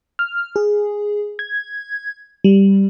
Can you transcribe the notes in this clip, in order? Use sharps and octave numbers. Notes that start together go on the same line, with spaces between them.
F6
G#4
G#6
G3